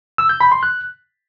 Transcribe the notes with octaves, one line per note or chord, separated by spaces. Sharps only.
E6
G6
B5
C6
F#6